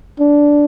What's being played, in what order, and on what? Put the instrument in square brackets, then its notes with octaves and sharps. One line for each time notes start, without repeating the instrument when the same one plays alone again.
[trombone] D4